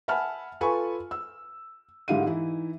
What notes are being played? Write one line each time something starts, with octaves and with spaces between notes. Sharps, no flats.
E5 F#5 G#5 A5 B5 F6
F4 A4 B4 G#5 B5 C#6
E6
G#2 D3 E4 G4 F5 D#7
E3 D#4 E4